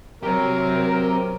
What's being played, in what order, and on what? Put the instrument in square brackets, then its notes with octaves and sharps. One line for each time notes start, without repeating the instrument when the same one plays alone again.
[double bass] F#3 [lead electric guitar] C4 G4 [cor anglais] A#4